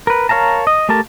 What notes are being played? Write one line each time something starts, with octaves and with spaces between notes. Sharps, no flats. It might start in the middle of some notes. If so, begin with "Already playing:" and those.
A#4 B4
A#4 C#5 F5 A5 A#5
D#5
A3 G4 A#4 A5